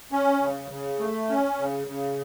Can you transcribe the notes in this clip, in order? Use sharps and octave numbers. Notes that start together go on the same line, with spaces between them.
C#4
C#3
C#3
A3
C#4
C#3
C#3